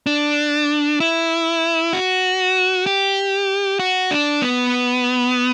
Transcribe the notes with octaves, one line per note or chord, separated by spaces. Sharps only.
D4
E4
F#4
G4
F#4
D4
B3